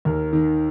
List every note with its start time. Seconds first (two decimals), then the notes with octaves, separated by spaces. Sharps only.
0.05 D#2 A#4
0.33 D#3